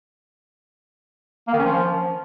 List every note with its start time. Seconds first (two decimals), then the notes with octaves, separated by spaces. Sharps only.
1.48 A#3
1.53 D#3
1.59 C#4
1.65 F3